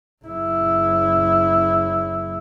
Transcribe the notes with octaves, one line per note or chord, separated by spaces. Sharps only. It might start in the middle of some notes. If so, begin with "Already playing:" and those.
F#1 E4